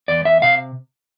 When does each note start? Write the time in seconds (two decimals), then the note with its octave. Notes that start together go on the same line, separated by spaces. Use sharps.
0.08 E2 D5
0.25 E2 E5
0.42 C3 F5